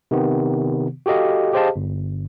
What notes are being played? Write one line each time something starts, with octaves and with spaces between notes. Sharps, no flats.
C3 D#3 B3
F#4 G4 A4 D#5 F5
G4 G#4 C5 D#5 F5 A5
G1